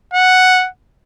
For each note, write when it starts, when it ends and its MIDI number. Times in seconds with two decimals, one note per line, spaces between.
0.14 0.68 78